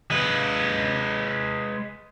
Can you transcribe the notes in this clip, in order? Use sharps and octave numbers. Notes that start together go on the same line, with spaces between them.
G#3 B4